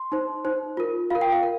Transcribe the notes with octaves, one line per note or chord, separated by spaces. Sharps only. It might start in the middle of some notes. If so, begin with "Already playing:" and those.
Already playing: C6
D#4 C5
D#4 C5
F4 A#4
F4 A#4 F5
G5
F5
A#4